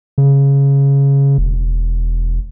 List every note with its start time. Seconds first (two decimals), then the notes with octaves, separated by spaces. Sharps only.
0.18 C#3
1.38 E1